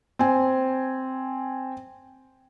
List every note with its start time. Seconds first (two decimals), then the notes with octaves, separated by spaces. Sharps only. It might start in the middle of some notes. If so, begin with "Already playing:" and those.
0.19 C4 G#5